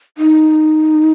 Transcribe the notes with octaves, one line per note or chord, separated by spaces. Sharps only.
D#4